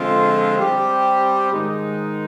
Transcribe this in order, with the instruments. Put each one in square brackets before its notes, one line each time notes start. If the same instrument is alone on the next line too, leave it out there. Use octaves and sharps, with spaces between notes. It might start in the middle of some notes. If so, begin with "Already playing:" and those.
Already playing: [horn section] D3 F3 G#3 C4 F4
G3 C4 G4
G#2 D#3 G#3 D#4